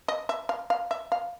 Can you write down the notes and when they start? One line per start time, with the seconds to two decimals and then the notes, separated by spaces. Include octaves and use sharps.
0.08 D#5
0.29 E5
0.49 F5
0.70 F5
0.91 E5
1.12 F5